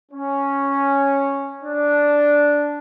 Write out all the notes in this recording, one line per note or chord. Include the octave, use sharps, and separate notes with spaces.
C#4
D4